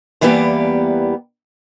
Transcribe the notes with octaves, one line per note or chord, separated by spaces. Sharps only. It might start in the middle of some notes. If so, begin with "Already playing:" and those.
E2 E3 G3 A#3 B3 G4